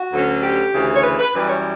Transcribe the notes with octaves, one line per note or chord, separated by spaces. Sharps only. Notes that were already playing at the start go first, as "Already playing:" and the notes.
Already playing: F#4
D2 D3 F#3 C#4
G4
D2 C#3 E3
C#5
B4
B4
F#2 E3 G3 B4
C#5